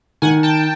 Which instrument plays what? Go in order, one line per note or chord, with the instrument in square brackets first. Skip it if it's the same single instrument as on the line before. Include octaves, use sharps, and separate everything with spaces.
[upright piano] D#3 [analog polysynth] F#5 G#5
[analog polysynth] G5 A5